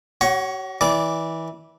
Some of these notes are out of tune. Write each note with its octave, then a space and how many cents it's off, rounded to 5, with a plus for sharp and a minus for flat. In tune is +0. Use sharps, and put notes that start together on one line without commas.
F#4 +40 C#5 +0 F#5 +0
E3 -20 D5 -15 D6 +0